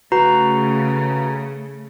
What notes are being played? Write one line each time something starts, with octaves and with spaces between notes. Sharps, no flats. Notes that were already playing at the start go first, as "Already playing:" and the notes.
C#3 A3 F#4 B4 A#5